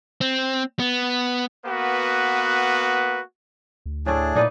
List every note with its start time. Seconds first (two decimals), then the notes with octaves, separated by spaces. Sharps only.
0.21 C4
0.79 B3
1.65 A#3 B3 F#4 B4
3.86 D2
4.06 A2 A3 D4 G#4 D5
4.35 A#2 A#3 D#4 B4 D5